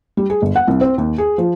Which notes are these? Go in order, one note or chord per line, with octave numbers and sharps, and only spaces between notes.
G3
G#4
G1
F#5
C2
C4
D#2
G#4
F3